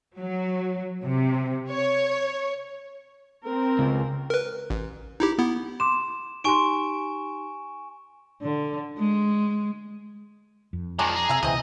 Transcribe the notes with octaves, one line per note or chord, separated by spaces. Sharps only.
F#3
C3
C#5
C4 A#4
C#2
A#4 B4
A1
D#4 E4 G4
B3 E4
C6 D6 E7
D#4 G4 G#5 C6 C#6 D7
D3
G#3
F2
D#3 F3 G#3 D4 G#5 A#5
G#4 A#5
C3 E5 G#5
C#2 B2 E3 C4 G#4 D#5